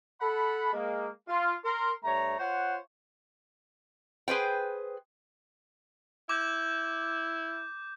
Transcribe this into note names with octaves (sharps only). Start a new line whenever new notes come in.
A4 F#5 A5 B5
G#3 A#3
F4
A#4 C6
G2 A3 C#5 A#5
F4 C5 C#5 F#5
G#4 B4 C5 G5
E4 D6 G6